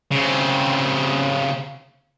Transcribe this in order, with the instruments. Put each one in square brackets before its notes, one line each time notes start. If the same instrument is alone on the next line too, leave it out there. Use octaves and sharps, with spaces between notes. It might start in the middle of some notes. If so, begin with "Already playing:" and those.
[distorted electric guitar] C#3 C4